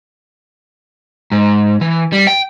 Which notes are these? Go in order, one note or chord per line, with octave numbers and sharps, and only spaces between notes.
G#2
E3
G3
G5